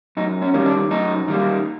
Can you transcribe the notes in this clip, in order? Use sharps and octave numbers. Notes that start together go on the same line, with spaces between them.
F#2 D#4
C#4
D#3 G3 A#3
C#4
D4
F#2 D#4
D#3 G3 A#3